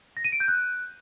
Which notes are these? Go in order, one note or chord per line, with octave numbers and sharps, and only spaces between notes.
A#6
D#7
D7
G6
F#6